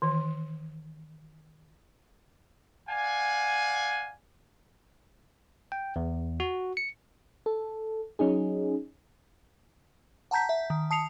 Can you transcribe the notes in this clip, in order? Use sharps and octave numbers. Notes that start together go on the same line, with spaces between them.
D#3 E3
D5 F5 F#5 G#5
G5
E2
F#4
C#7
A4
F#3 C#4 D#4 G#4
F#5 A5 A#5 G6 B6
E5
D#3
A5 D#6 C7 C#7 F7